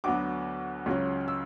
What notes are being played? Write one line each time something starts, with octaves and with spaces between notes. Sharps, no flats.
D2 D3 F#3 B3 D6
C#2 C#3 F#3 C#4
E6